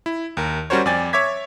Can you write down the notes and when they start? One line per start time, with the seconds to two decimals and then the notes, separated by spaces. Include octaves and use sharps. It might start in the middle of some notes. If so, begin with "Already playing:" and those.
0.06 E4
0.37 D#2 A#4
0.70 G3 C#4 F#4 A#4 C5 C#5
0.86 F2 D5 G5 G#5 A6
1.13 C#5 E5 D6 G#6 B6